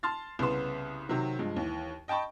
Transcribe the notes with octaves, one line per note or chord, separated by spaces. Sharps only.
A5 C6 F6 A6
C2 C#3 B3 B4 C6 E7
C3 D#3 F#3 C4
G2 F3 G#3
D#2 E3
D#5 G5 A5 B5 C#6